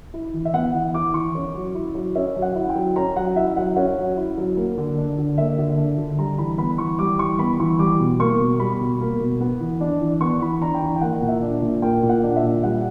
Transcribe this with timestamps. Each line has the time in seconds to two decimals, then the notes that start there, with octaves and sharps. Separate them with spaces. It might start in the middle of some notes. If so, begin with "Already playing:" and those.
0.14 E4
0.33 E3
0.45 E5
0.54 B3 F#5
0.74 E3
0.94 E4 D6
1.14 E3 C#6
1.35 C#4
1.55 F#3
1.75 E4
1.95 F#3
2.15 C#4 E5
2.36 F#3
2.42 F#5
2.55 E4
2.69 G5
2.75 F#3
2.96 C#4 A#5
3.16 F#3 F#5
3.36 E4 E5
3.56 F#3 F#5
3.76 C#4 F#5
3.96 F#3
4.17 E4
4.38 F#3
4.57 A#3
4.77 D3
4.98 D4
5.18 D3
5.38 A#3 E5
5.58 D3
5.77 D4
5.98 D3
6.18 G3 A#5
6.38 E3 B5
6.58 B3 B5
6.78 E3 C#6
6.99 G3 D6
7.19 E3 C#6
7.39 B3 B5
7.60 E3 C#6
7.79 G3 D6
8.00 B2
8.20 A#3 C#6
8.40 B2
8.60 G3 B5
8.81 B2
9.01 A#3
9.20 B2
9.40 B3
9.60 E3
9.81 D4
10.01 E3
10.21 B3 C#6
10.42 E3 B5
10.62 D4 A#5
10.75 G5
10.82 E3 A#5
10.96 G5
11.01 A#3 F#5
11.22 A#2
11.28 E5
11.42 D4
11.62 A#2
11.82 A#3 G5
12.03 A#2
12.09 F#5
12.23 D4
12.36 E5
12.43 A#2
12.63 G3 F#5